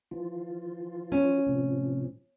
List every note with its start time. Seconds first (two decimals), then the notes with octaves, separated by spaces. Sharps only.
0.11 E3 F3 F4
1.12 C#4
1.47 A2 C3 F3